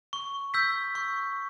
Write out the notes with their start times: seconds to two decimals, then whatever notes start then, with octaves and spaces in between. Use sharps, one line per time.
0.13 C#6
0.54 E6 G6 B6
0.95 C#6